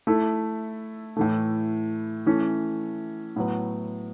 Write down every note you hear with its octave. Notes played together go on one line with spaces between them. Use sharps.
A3 E4 A4
A2 E3 A3
E3 A3 C#4 A4
A2 F#3 B3